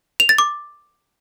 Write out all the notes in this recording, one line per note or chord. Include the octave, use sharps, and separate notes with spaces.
F7
A6
D6